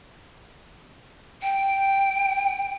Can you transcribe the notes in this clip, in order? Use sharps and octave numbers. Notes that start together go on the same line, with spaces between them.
G5